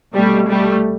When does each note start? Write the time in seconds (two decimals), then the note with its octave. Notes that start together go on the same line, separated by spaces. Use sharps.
0.14 C2 B2 G3 A3
0.49 G3 A3